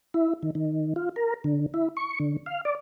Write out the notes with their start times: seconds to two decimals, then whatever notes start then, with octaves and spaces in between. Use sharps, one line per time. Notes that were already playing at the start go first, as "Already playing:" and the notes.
0.14 E4
0.43 D#3
0.55 D#3
0.96 F4
1.16 A#4
1.44 D3
1.74 E4
1.97 C#6
2.20 D3
2.46 F5
2.65 D5